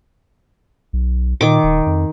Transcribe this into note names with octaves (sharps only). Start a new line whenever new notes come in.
B1
A#2 D#3 D6
D#1
F2